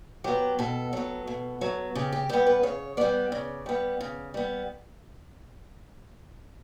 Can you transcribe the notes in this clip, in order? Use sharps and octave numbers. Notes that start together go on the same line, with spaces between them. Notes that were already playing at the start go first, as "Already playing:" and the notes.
F#3 B3 G4
B2 A4
F#3 B3
B2
F#3 B3
C#3 G4
G4
G3 B3 G4
B4
C#3 C#5
G3 B3 D5
C#3
G3 B3
C#3
G3 B3